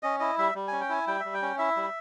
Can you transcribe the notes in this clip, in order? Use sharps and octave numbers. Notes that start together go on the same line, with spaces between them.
C#4 D#5
E4 D#5
G3 E5
G3
C#4 G#5
G5
E4 G#5
G3 G5
G3 E5
G5
C#4
E4 E5
G3